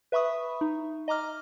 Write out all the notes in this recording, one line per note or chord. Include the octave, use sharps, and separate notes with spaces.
B4 E5 B5 C#6 D#6
D#4
D#5 A#5 D6 F6